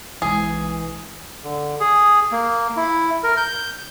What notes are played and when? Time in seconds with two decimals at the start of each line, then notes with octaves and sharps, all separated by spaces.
0.22 B1 E3 G#3 G#4
1.44 D3
1.80 G#4
2.32 A#3
2.77 E4
3.23 A#4
3.37 G6